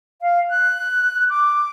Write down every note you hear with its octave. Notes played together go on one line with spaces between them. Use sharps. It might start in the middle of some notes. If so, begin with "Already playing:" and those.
F5
F#6
D6